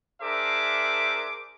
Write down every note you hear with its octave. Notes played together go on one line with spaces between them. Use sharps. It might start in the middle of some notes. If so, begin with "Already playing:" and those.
D4 G#4 A#4 C5 E5 D6